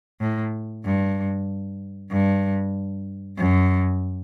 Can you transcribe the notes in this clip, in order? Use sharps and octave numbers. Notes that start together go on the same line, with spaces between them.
A2
G2
G2
F#2